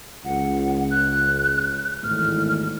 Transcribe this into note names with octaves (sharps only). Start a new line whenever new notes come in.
C#2 F#5
F#6
G#1 E2 A2 F6